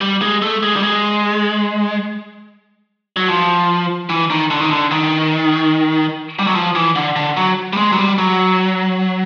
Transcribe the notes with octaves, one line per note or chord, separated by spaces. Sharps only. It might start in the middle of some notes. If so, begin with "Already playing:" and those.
G3
G#3
A3
G#3
G3
G#3
F#3
F3
E3
D#3
D3
D#3
D3
D#3
G3
F#3
F3
E3
D3
D3
F#3
G3
G#3
F#3
G3
F#3